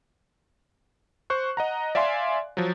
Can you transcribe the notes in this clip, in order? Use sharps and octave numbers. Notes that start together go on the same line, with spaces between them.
C5 C#6 F#6
D#5 F#5 A#5
D5 E5 F5 G#5 C6
F3 F#3